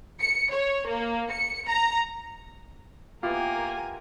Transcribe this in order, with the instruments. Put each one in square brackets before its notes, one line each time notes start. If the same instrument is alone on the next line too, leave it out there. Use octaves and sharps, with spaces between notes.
[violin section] C#7
C#5
A#3
C#7
A#5
[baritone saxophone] A#3 [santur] B3 E4 G4 [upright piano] F4 [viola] A#4 G#5